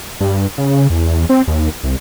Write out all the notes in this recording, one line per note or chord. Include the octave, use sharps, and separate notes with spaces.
G2
C#3
E2
C4
D#2
C2